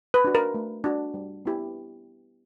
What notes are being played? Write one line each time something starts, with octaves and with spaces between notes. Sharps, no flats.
B4
D4 F#4
A#4
A3
D4 F#4
G3
B3 E4 G4